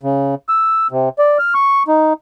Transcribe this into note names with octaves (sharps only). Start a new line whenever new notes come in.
C#3
E6
C3
D5
F6
C#6
D#4